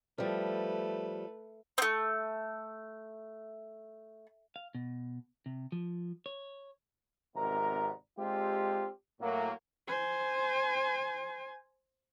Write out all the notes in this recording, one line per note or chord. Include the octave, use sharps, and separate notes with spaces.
F3 G3 A3 B4
A3 C4
F5
B2
C3
F3
C#5
G#1 C3 B3 A#4 D5 A#5
G#3 C4 D4 F4 G4
A2 F#3 A#3
C5 G#5